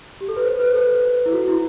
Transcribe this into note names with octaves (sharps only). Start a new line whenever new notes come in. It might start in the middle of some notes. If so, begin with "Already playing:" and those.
G4
A4
B4
C5
B4
A4
E4
F#4
E4